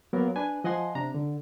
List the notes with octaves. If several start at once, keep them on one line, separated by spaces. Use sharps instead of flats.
F#3 A#3 B3 A#4
D4 B4 G#5
F3 D#5 F#5 G#5 C6
C3 D4 A#5
D3